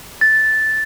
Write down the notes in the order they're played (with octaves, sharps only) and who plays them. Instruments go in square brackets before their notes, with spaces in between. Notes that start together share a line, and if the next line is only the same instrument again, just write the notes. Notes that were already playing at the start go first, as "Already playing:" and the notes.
[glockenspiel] A6